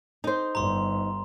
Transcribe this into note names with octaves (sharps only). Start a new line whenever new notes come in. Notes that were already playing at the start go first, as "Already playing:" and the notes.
D#4 C5
G1 A#5 C6